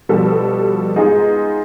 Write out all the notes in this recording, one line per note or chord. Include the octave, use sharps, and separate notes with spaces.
B2 F3 G3 A4 B4
G#3 B3 D#4 F4 G#4